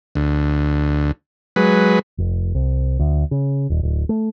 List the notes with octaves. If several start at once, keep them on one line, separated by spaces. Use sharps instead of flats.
D2
F#3 G#3 B4
F1
C2
D2
C#3
D#1
D1
A3